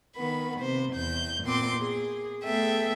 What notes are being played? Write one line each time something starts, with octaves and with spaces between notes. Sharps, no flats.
D#3 B3 B5
C3 C5
E2 G6
A#2 B3 C4 C6 D6
G#4
A3 B3 G#4 A4 E5 G5